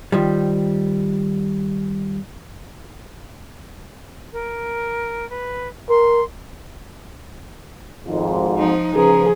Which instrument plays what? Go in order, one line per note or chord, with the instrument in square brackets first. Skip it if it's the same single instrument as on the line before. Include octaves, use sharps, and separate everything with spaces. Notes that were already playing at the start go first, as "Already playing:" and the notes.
[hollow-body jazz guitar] D#3 F3 G3
[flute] A#4
B4
[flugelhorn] A#4 [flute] C6
[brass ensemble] G#1 F2 G#2
[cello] F3 D#4
[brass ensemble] C#3 B4 A#5 [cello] F3 [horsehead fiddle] G#4